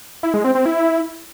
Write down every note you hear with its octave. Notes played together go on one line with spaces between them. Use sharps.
E4
G#3
C4
C4
E4